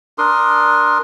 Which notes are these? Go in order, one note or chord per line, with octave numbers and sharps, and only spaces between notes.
D4 A#4 C6 D#6